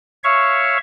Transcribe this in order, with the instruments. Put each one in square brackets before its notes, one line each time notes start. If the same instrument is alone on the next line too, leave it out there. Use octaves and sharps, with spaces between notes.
[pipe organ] C#5 E5 F5 C#6